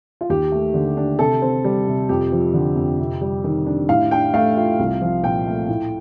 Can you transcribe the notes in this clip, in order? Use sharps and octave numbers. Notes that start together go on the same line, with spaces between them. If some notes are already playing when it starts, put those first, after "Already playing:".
F4
D#2 G4
A3
D3
D4
C3 A4
C4
G3
C3
F2 G4
F3
D3
F2
C3
G3
D#3
D4
A2 F5
D4 G5
A3 F5
F4
C2
F3
A#2 G5
A3
A2